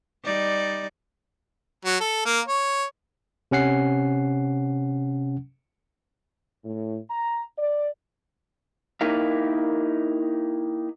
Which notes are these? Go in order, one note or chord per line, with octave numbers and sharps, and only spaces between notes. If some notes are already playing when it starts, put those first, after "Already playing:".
G3 D#4 D5
F#3
A4
A#3
C#5
C3 C#4 F#5 C7
A2
A#5
D5
A#3 D#4 E4 G4 A#4 F5